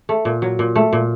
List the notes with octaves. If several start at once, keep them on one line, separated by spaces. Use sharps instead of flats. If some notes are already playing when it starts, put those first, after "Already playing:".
A3
A#2
F#3
A#2
A3
A#2